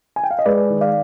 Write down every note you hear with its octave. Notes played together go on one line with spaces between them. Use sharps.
G#5
G5
F5
D#5
G#3 B4 D5
D#3
D5 F5